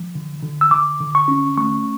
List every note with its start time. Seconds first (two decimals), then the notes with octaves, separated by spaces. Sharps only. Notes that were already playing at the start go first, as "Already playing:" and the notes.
Already playing: F3
0.15 D3
0.43 D3
0.61 E6
0.71 D3 D6
1.01 D3
1.15 C#6
1.28 C#4
1.57 A3 C#6